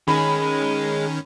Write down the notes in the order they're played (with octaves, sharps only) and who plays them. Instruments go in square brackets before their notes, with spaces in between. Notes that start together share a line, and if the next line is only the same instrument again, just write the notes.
[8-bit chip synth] D#3 C#4 [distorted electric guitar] G#4 D#5 [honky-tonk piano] B5